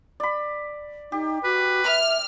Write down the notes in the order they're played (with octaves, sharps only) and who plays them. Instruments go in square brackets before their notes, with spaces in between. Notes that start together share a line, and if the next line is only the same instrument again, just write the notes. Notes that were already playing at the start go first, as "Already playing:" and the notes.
[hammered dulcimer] D5 B5
[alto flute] D#4 [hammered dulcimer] G4
[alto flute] F#4 [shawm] B4
[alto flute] E5 [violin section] F6